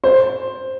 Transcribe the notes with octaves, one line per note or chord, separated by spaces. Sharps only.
C5